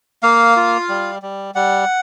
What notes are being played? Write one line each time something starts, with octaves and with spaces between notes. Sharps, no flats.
A#3 F5
F4
G3
G3
G3 F#5